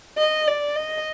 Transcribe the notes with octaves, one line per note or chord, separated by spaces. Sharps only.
D#5
D5
D#5